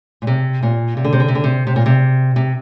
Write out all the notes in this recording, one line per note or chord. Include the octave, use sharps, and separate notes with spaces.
A#2
C3
A#2
C3
D3
C3
D3
C3
D3
C3
C3
A#2
C3
C3